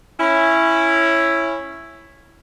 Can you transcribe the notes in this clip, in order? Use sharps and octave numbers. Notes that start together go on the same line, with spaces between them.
C#4 E4